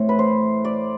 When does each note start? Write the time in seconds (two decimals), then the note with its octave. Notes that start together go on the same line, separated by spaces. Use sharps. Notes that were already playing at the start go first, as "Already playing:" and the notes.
Already playing: A2 E3 A3 C4
0.09 B4
0.19 C5
0.65 D5